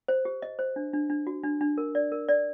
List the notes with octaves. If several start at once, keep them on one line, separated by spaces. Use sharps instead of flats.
C5
G4
D#5
C5
D4
D4
D4
F#4
D4
D4
A#4
D5
A#4
D5